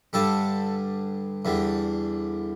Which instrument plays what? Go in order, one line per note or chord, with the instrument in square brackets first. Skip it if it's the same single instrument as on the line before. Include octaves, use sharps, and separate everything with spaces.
[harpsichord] G2 D3 G3 A4
E2 D3 G3